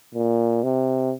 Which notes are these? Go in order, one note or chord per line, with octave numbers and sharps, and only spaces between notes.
A#2
C3